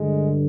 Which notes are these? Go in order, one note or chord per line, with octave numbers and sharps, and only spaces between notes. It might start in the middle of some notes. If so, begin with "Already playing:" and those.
Already playing: G2 D3 G#3